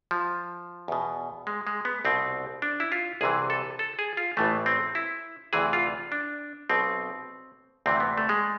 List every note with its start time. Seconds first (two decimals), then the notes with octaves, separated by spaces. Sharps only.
0.11 F3
0.88 E2 B2
1.47 G#3
1.67 G#3
1.85 B3
2.05 C2 B2 C4
2.62 D4
2.80 E4
2.92 F4
3.21 C2 C3 E3 G#4
3.50 A4
3.79 A4
3.99 G#4
4.17 F4
4.37 A1 A2 E3 A3
4.66 C4
4.95 E4
5.53 D2 C3 E3 G#4
5.73 F4
6.12 D4
6.70 B1 B2 C4
7.86 D2 C3 E3 C4
8.00 B3
8.17 A3
8.29 G#3